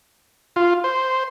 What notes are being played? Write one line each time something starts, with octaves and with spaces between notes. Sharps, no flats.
F4
C5